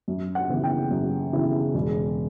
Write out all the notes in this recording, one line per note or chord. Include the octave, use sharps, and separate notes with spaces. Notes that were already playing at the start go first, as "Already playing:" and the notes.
F#2
F#5
C#3 E3 B3 E4
G5
F#2
C#3 E3 B3 E4
E1